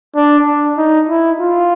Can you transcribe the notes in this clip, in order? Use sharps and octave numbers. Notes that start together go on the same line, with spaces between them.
D4
D4
D#4
E4
F4